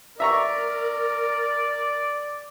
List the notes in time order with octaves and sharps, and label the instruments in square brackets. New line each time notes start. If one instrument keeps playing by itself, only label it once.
[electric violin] A#4 [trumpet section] D5 [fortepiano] E5 A#5 C#6